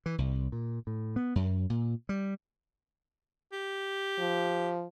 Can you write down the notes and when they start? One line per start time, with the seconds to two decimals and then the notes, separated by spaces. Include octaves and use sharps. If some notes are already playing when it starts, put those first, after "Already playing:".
0.06 E3
0.18 C2
0.52 A#2
0.87 A2
1.16 B3
1.35 F#2
1.70 A#2
2.09 G3
3.52 G4
4.19 F3